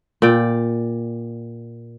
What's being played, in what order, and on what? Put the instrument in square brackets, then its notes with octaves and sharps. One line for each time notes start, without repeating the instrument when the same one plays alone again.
[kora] A#2 D5 G5